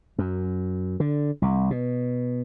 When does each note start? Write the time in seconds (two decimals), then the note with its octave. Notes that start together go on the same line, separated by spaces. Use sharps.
0.18 F#2
1.00 D3
1.42 C2
1.71 B2